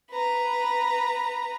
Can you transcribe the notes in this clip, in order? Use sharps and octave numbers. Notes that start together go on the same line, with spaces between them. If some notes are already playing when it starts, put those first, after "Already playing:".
B4 A#5